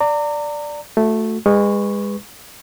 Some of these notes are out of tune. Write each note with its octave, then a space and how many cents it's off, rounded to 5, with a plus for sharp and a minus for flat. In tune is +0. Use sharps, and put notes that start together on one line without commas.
D5 +0 A#5 -35
A3 +0 F#4 -30
G#3 -30 B4 +5 C#6 -5